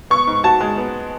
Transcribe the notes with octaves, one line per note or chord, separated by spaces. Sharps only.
B3 C#6
G#2
F#4 A5
G#3
B3